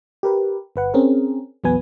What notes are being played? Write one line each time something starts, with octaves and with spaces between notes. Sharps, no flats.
G4 A#4 B4
G1 B4 F#5
C4 C#4 G#4 A#4
A#1 E2 F#3 B3 B4 G#5